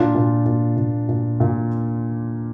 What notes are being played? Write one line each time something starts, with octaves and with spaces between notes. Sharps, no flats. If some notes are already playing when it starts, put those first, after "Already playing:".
Already playing: A#2 D4 F4
A#2
A#2
A#2
A#2
A#2